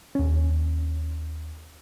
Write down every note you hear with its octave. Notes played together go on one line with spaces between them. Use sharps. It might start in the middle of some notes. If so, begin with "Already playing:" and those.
D#2 C#4